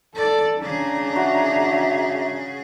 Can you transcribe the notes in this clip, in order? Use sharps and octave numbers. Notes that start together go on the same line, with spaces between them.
A4 D5
C#3 D4 G#4 A#5
F#4 E5